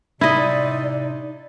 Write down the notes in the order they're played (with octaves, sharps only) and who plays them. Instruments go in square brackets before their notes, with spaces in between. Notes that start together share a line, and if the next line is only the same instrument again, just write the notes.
[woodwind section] A2 C3 [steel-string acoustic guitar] D#4 [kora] E4 D#5 [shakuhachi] D5